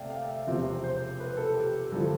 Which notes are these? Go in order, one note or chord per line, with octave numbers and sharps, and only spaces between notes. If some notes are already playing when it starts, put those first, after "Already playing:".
Already playing: C3 A3 D5 E5 F5 G5
F5
E5
E1 E2 C3 F3 C4
C5
B4
A4
G4
G2 D3 F3 A4